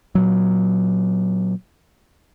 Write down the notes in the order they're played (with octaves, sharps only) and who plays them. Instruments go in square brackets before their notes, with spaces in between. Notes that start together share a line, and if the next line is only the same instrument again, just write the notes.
[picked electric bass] A#2 F#3